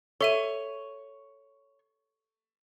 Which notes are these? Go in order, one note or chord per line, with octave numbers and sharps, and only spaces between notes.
A4 C#5 E5 D#7